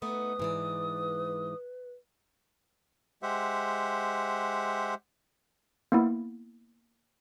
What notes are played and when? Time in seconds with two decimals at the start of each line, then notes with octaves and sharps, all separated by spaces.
0.02 A3 B3 D#4 B4 D#6
0.39 G#2 E3 D5
3.23 G#3 G4 C5 E5 F#5
5.92 A#3 B3 E4